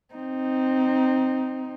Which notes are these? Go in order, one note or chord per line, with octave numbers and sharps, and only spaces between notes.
C4 D#4